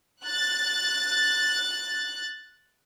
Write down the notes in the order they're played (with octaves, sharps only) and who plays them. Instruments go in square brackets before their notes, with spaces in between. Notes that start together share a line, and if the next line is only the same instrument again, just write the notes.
[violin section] F#6 A6